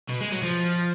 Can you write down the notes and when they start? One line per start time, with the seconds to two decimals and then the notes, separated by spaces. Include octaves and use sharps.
0.09 B2
0.21 G#3
0.32 F#3
0.43 F3